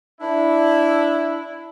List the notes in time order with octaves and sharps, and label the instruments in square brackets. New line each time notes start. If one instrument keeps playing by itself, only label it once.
[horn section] D4 E4